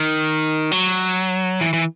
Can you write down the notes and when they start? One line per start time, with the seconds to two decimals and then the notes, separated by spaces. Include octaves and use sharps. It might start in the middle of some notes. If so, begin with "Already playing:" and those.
Already playing: D#3
0.71 F#3
1.61 E3
1.73 E3